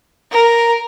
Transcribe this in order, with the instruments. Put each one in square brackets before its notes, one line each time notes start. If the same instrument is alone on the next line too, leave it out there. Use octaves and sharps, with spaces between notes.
[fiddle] A#4